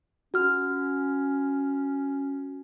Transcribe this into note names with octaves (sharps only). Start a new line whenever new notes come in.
C#4 F#4 F6